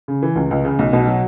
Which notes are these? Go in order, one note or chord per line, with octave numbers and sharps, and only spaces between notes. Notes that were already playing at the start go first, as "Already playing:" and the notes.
C#3
E3
C#2
C#2
C#3
B1
B2
F#3